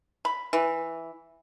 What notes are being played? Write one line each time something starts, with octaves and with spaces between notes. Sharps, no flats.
B5
E3